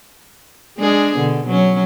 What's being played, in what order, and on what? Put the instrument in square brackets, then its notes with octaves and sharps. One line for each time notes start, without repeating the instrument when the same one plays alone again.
[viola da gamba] G#3 D4 G#4
B2 D3
F#3 C#4